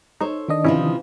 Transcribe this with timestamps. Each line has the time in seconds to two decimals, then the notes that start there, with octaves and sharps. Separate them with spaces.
0.21 D#4 A4 C5 C#5
0.49 D#3 D4 D#5
0.64 C3 E3 F3 C#4 E4